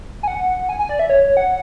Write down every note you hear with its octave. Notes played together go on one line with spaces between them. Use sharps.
G#5
F#5
G#5
G#5
D5
E5
C#5
C#5
F#5